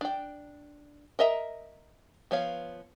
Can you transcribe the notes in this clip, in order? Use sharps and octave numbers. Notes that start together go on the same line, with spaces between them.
D4 G5
A#4 D#5 E5 A#5
F3 B3 C#5 F5